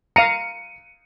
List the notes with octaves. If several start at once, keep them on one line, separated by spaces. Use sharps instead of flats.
F5 A#5 C#7 D#7